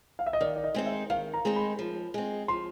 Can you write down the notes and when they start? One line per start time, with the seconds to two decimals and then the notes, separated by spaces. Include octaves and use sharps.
0.19 F5
0.26 E5
0.33 D#5
0.41 D#3 D5
0.56 D5
0.64 D#5
0.74 G#3 C4 D#4
0.86 E5
1.10 D#3 F5
1.34 A#5
1.45 G#3 C4 D#4
1.56 B5
1.79 F3
2.14 G#3 C4
2.48 F3 C6